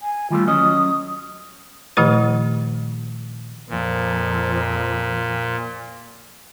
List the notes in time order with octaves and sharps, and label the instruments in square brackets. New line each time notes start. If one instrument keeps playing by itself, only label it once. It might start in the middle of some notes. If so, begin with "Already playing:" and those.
[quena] G#5
[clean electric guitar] D#3 G3 A3 [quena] F4
[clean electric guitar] F#3 C#4 D#5 [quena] D#6
[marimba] A#2 D#3 F3 A3 E4 B4
[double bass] F2 F3 [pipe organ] A#2